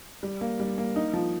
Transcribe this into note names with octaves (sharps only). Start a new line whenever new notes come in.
G3
A#3
G3
A#3
D#4
F3